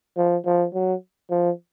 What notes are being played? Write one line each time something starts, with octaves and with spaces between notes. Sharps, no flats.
F3
F3
F#3
F3